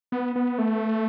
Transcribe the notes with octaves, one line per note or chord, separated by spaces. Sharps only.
B3
B3
A3